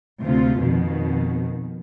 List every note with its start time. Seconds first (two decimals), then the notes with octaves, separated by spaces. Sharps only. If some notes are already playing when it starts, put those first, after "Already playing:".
0.21 D2 C3 F4
0.58 F2 B2 D#3